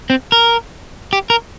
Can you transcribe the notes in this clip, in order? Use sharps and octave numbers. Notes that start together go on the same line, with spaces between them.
C4
A#4
G4
A#4